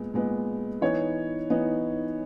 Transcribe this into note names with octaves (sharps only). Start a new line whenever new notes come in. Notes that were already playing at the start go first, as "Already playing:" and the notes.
Already playing: A#2 G#3 B3
A#2 G#3 B3
E3 B3 D#4 C#5
E3 B3 D#4